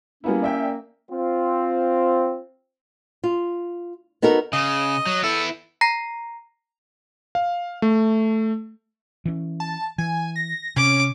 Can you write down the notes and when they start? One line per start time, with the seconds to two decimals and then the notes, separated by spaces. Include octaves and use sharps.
0.24 G3 A#3 B3 C#4 E4
0.42 D5 E5 G5
1.11 C4 F4 C5
3.24 F4
4.22 B3 D#4 F#4 A4 A#4
4.53 C#3 D#5
5.06 F#3
5.23 B3 E4 A4
5.81 A#5 A#6 C7
7.35 F5
7.82 A3
9.25 E3 C#4
9.60 A5
9.98 E3 G#5
10.36 A#6
10.76 C3 C#4 D6